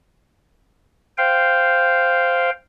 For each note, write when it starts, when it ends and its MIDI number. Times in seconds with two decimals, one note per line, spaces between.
1.18 2.50 72
1.18 2.50 77
1.18 2.50 79